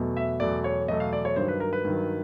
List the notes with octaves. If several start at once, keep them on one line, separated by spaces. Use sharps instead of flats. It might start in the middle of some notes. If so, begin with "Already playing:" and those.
Already playing: E2 B2 F#3 A3
E5
E2 B2 F#3 A3 D5
C#5
E2 B2 F#3 A3 D#5
F5
D5
C#5
G2 D#3 F#3 C5
B4
A#4
B4
G2 D#3 F#3